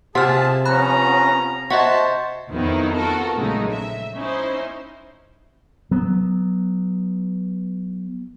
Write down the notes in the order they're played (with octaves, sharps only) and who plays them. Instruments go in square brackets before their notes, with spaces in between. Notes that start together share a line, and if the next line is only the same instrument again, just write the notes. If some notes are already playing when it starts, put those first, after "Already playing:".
[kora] C3 F4 [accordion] G#4 A5 [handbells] F#5 F6
[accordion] F3 B3 C#4 [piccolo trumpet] A#5 [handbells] B5 F#6
[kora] F#4 [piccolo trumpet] C5 [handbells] D#5 E5 F#5 [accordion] A5
[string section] F2 D#3 F#3 B3 D#4 E4
B3 F4 F#4 A4 A#4
A#1 C#3 F#3 G#3 A3 D#4
E5
C#4 D#4 E4 C5
[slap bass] F#3 B3